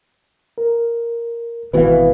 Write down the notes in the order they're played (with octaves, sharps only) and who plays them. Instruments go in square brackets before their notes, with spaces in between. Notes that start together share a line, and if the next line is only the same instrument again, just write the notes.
[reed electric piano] A#4
[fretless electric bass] G#1 B2 E3 [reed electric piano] B4 F5